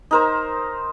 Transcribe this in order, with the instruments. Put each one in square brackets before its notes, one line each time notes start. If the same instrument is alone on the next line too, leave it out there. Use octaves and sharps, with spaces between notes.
[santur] D#4 A#4 C5